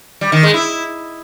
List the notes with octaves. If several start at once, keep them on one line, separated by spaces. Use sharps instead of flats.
G3
D#3
G#3
E4